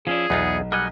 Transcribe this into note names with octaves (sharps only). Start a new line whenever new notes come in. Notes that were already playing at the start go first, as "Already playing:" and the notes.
F3 C#4 E4 F4 G#4 D5
B1 E2 B3 D#4 F4
G3 A#4 D#5 F#5 G#5